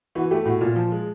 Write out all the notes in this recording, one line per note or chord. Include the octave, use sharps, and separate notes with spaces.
E3 F#4
A3 G4
A2 F#4
A#2 F4
F3
G#3